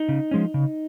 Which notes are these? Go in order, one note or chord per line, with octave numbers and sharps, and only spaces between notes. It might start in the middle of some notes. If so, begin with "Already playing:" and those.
Already playing: D#4
C#3
F3 G#3 C#4
C#3